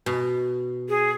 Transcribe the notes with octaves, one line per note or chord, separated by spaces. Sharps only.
B2
G#4